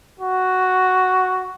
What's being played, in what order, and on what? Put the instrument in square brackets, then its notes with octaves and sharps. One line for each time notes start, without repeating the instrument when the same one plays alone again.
[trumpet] F#4